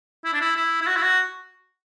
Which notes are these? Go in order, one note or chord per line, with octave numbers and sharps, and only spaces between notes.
E4
D4
E4
E4
E4
F#4
E4
F#4